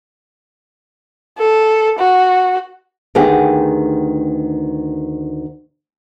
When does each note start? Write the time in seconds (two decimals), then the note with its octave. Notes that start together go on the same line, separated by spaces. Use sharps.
1.39 A4
1.99 F#4
3.15 D2 D#3 B3 G4 G#4 F#5